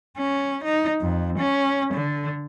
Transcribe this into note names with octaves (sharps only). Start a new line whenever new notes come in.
C#4
D#4
F2
C#4
D3